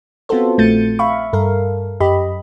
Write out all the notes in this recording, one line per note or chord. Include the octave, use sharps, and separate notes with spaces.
B3 C4 F4 F#4 A4 C5
A#1 A3 G6 A6 C#7 D#7
E5 F5 B5 C#6
G2 A4 A#4 F5
F#2 G4 D#5 B5